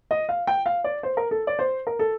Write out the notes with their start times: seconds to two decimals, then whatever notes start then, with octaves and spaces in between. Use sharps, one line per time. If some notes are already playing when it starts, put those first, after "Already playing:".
0.11 D#5
0.29 F5
0.47 G5
0.66 F5
0.84 D5
1.03 C5
1.17 A#4
1.31 A4
1.47 D5
1.59 C5
1.87 A#4
1.99 A4